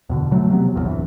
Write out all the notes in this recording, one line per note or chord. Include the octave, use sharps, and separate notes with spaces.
E2 B2 D3
B2 F#3 G#3 A3
C3 F#3 A3 B3
F1 A#1 E2
D1 E3